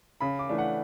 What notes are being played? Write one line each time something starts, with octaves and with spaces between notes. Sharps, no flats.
C#3 B5
D6
E3 A3 D4
F#5